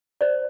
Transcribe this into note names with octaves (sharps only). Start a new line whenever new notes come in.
C5 D5